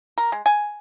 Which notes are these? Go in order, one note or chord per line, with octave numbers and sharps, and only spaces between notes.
A#4
G#3
G#5